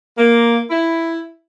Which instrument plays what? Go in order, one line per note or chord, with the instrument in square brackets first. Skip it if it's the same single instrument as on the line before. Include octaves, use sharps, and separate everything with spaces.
[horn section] A#3
E4